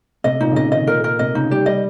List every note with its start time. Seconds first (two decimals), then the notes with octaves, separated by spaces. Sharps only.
0.24 C3 D#5
0.41 A#2 D#4
0.52 C#3
0.56 C3 D#5
0.72 D#3 D#5
0.87 A#2 A#4
1.04 A#4
1.19 C3 D#5
1.35 C#3 D#4
1.51 G3 G4
1.66 G3 D#5